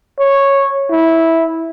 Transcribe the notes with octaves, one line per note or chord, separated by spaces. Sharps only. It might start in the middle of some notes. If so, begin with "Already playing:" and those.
C#5
E4